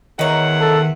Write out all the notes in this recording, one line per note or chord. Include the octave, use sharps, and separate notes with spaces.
E2 D#3 D#4 C#5 E5 F#5
A4